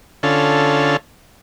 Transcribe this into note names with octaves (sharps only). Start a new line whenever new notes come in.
D3 C#4 F4 A4